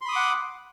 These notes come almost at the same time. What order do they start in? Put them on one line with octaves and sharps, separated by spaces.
C6 B5 D#6 D6 F#5